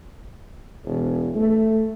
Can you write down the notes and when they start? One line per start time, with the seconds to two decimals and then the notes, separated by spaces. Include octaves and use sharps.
0.85 E1
1.35 A3